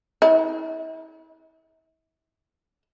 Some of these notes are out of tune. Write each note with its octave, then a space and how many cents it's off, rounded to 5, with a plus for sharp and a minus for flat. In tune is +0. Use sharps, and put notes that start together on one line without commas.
E4 -40